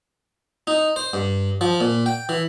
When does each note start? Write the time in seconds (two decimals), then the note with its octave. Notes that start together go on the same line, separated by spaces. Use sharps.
0.67 D#4
0.96 C5
1.13 G2
1.61 F3
1.81 A#2
2.06 G5
2.29 E3